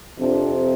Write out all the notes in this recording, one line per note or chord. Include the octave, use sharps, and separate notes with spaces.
F2 C3 F3 D4